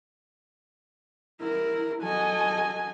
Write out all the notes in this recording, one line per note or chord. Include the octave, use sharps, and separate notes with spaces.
E4 A#4
F#3 A4 D#5 G#5